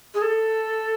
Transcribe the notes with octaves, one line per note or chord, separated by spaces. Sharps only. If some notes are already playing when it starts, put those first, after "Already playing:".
G#4
A4